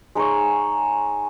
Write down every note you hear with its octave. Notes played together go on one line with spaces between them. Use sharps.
G#3 D#4 G#4 C#5